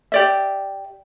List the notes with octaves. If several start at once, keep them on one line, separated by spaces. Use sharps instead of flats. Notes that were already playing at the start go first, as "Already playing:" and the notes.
G4 D5 E5